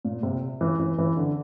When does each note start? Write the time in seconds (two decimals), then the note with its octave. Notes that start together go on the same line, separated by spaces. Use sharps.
0.05 A#2
0.23 C3
0.61 E3
0.80 E3
0.98 E3
1.17 D3